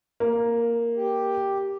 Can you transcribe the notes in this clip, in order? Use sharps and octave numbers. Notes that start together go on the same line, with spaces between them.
A#3
G4